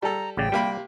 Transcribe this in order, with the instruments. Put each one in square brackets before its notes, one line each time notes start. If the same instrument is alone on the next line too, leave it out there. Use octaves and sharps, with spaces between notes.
[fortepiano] G3 A4 [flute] A#5
[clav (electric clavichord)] A1 C#3 D5 [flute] G5
[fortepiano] C3 A#3 B5 [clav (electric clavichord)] G3